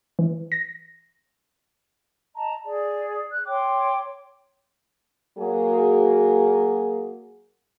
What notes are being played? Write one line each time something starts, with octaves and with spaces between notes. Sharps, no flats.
E3
A#6
D#5 A5 A#5
G#4 D5
F#6
C#5 G5 C6 D6
F#3 A#3 F#4 G#4